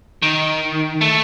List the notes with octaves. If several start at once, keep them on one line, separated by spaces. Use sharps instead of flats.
D#3
A3